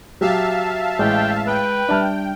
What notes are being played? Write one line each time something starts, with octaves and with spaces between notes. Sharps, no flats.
F#3 G4 E5 F5 A5
A1 G#3 G5
B4 G5
G3 D4 E5 A5 F6